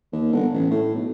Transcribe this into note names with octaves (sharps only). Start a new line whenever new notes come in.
D#2
G1
A1
A2
B1